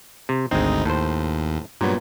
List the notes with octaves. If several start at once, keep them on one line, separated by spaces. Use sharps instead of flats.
C3
G#1 D2 G#3 C4 D#4
D#2 A2 C5
G2 A#2 F#3 B3